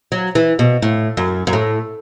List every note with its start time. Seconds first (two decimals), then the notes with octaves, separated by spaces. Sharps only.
0.12 F#3
0.35 E3
0.59 B2
0.82 A2
1.17 F#2
1.47 F#2
1.53 A2